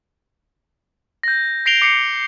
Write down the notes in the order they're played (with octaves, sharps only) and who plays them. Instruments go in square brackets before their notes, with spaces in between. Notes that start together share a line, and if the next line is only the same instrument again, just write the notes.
[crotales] G6 A#6
A#6 C7 D7 F7 G7
D6 C7 C#7 G7